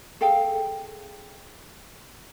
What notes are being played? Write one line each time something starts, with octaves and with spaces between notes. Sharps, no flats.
G#4 A4 F5 G5